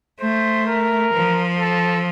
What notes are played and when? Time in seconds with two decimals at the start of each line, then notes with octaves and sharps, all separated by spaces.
0.20 A3 C5
0.67 A#4
1.13 F3
1.59 A4